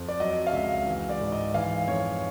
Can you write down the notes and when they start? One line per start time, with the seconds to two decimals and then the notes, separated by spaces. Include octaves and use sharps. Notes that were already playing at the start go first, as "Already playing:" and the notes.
Already playing: F2
0.08 D5
0.20 F#3 D#5
0.47 F5
0.53 C#2 E5
0.87 E3
1.09 D5
1.21 G#2
1.32 D#5
1.54 E3 F5
1.88 F2 C#5